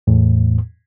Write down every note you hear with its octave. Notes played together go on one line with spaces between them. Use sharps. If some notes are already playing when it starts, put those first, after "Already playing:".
E2 A2